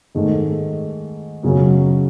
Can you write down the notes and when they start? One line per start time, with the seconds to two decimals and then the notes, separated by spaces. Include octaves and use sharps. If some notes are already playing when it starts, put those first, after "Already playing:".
0.15 G#2 D#3 A3
1.43 F#2 C#3 F#3 C#4